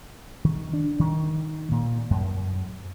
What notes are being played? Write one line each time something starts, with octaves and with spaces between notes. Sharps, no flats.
D#3
D4
D#3
A#2
F#2